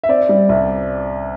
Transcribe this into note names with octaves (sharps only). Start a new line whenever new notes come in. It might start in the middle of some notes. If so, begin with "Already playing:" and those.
E5
C4 D5
G3
C2